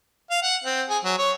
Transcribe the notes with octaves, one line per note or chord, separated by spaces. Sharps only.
F5
F#5
C4
G#4
F#3
C#5